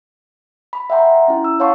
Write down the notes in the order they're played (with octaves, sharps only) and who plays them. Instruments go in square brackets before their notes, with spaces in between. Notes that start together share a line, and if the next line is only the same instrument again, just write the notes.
[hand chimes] B5
E5 F#5 G5 A#5 C6
A#5
C#4 E4
E6
C#5 F5 F#5 A5 C6 C#6